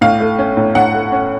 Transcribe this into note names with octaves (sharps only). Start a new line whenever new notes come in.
A2 F5
A3
C#4
A2
A2 F#5
A3
C#4